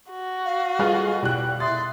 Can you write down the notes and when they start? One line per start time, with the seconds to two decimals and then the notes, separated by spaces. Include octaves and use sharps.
0.10 F#4
0.45 F5
0.79 G3 F4 G#4 A4 B4 D#5
1.23 B2 G3 E4 G5 F#6
1.60 E5 C6 D#6 A6